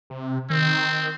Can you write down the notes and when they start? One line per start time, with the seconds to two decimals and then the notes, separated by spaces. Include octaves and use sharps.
0.10 C3
0.50 D#3 C4